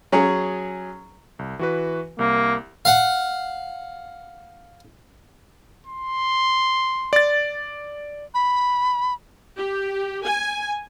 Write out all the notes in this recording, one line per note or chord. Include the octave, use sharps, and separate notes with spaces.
F#3 C#4 G#4
C2
E3 F#4 B4
C2 A#3
F5 F#5
C6
D5 A6
B5
G4
G#5